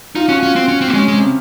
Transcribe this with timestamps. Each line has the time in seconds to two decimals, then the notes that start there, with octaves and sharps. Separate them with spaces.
0.15 D#4 F4
0.29 C#4 F#4
0.40 C#4 F4
0.56 C4
0.68 C#4
0.81 C4
0.88 A#3
0.94 G#3 C#4
1.08 G#3
1.13 C3
1.23 C#3